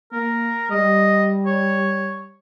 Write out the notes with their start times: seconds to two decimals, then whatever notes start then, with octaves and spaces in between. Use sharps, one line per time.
0.12 A#3 A#4
0.71 G3 D#5
1.46 C#5